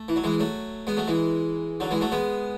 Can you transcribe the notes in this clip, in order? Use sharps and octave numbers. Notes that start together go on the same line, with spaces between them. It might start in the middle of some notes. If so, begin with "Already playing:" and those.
Already playing: A3
E3
F#3
E3 G#3
F#3 A3
G#3 B3
F#3 A3
E3 G#3
D3 F#3
E3 G#3
F#3 A3
G#3 B3